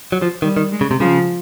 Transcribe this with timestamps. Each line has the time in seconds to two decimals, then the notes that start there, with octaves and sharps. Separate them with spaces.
0.12 F#3
0.22 F3
0.42 D#3 G3
0.57 D#3
0.72 G#3
0.81 C#3
0.91 C3
1.00 C#3 F3